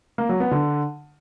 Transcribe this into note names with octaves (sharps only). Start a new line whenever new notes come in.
A#3
F#3
B3
D3